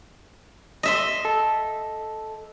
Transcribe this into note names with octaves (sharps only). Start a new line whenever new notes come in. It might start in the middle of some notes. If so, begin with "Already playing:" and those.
D#5 E5 C6
A4